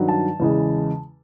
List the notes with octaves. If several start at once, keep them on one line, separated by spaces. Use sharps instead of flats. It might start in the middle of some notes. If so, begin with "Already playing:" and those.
Already playing: G2 D#3 F#3
A5
E2 C#3 E3 G#3